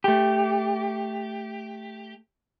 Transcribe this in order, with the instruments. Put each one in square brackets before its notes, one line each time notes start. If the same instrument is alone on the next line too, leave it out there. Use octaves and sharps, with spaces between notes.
[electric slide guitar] A3 G4